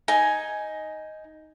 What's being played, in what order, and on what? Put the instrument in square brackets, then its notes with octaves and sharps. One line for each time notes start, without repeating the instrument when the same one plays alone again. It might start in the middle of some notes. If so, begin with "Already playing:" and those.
[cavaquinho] D#4 G#5